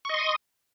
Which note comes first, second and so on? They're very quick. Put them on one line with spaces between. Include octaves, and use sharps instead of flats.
C#6 D#5 C6 D#6